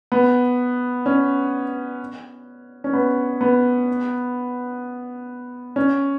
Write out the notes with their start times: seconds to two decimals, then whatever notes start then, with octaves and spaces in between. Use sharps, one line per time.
0.12 B3
1.06 C#4
2.84 C#4
2.93 B3
3.41 B3
5.76 C#4